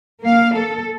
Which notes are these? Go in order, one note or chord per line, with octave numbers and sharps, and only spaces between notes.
A#3 F5
A4